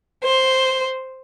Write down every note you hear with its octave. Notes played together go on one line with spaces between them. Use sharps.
C5